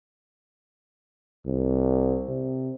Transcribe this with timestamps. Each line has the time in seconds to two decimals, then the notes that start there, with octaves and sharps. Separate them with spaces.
1.47 C2
2.28 C3